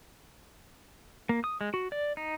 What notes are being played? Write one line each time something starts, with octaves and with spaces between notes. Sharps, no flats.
A#3
D#6
G#3
F#4
D5
D#4